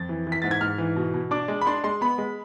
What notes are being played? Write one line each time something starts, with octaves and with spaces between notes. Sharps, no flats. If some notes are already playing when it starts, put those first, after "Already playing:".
Already playing: F2 A6
E3
E3
B6
G#2 A6
G#6
G#2 F6
E3
B2
B2
D4 D6
G#3
B5
D4 C6
G#3 C6
B3 B5
G#3